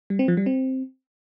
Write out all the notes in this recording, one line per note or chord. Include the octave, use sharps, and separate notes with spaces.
G3
C4
F3
G3
C4